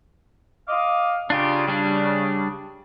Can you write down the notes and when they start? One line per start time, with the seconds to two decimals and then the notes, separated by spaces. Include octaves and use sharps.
0.68 D#5 F5 D6
1.30 C#3 D4 F4 G4
1.68 G3 D4